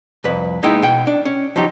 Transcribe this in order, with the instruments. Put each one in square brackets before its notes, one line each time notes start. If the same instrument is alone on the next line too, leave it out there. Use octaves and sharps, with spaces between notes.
[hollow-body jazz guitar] C2 F2 B4
G#3 A#3 B3 D#4 E4 G5
B2 F#5 G5
D4
C#4
F3 F#3 D#4 G4